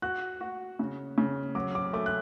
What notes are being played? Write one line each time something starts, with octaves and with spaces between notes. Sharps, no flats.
F#4 F#6
F#4
C#3
C#3
F#3 D6
D6
A3 D6
F#6